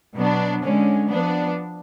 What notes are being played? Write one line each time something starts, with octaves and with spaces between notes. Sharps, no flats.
B2 F#3 B3 D4
D3 G#3 C#4
F3 B3 D4